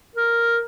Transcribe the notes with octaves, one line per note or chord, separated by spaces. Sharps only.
A#4